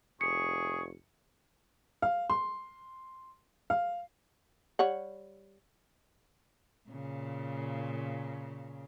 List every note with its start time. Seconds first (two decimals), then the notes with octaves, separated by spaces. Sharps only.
0.21 F1 G#4 C#6 C#7
2.02 F5
2.30 C6
3.70 F5
4.79 G3 C#5 F#5
6.89 A#2 C#3